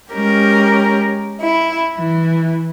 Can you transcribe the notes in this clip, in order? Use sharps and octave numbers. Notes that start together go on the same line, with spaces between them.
G#3 C#4 G4 A#4
E4
E3